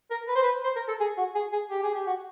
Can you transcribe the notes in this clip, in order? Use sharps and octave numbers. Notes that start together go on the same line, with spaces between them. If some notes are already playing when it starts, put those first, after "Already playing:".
A#4
B4
C5
B4
C5
A#4
A4
G#4
F#4
G#4
G#4
G4
G#4
G4
F#4